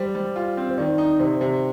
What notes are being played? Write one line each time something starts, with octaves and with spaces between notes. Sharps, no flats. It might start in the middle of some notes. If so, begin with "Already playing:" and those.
Already playing: G3 C5
G3
F4
C4
C5
D#3 D5
D#4
C3 C5
C3 C5